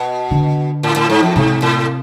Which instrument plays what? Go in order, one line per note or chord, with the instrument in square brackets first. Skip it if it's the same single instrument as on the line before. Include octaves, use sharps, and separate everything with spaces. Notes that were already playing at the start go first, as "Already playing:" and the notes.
Already playing: [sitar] B2
[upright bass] D3
[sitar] A2
A2
G#2
F2
[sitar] G#2 [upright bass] C3
[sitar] A2